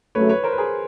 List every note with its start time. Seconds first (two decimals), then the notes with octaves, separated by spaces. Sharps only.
0.15 C#3 F#3 A3 B4 C#5
0.29 B4 C#5
0.44 A#4 C5
0.52 B4
0.58 G#4 A#4